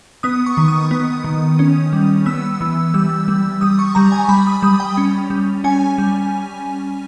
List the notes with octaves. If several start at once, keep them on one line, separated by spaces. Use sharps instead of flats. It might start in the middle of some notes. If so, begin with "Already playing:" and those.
B3 D#6
C#6
D#3
D#6
B3
D#3
C#4
G3
B3 E6
E3
G3 E6
G3
G3 D#6
C#6
G3 A#5
G#5
G3 B5
D#6
G3 D#6
G5
C#4
G3
C#4 G#5
G3